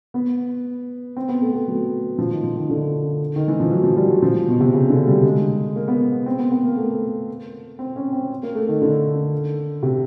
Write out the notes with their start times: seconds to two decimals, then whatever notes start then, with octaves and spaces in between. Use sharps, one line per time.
0.14 B3
1.17 C4
1.29 B3
1.42 A3
1.54 A3
1.68 F#3
2.19 F3
2.31 D#3
2.43 F3
2.57 D#3
2.69 D3
3.36 D#3
3.48 E3
3.60 F3
3.72 F#3
3.84 F3
3.97 G3
4.10 F#3
4.22 F3
4.48 B2
4.60 C3
4.73 C#3
4.90 D3
5.07 G3
5.24 G#3
5.76 A#3
5.88 B3
6.26 C4
6.39 B3
6.51 B3
6.64 A#3
6.77 A3
7.79 C4
7.96 C#4
8.13 C4
8.43 A#3
8.55 A3
8.68 D#3
8.81 D3
9.83 C3